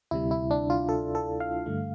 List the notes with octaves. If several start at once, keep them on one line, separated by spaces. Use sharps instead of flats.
D2 C3 G3 E4
E4
D4
F4
A4
A4
F5
G2 D3 A3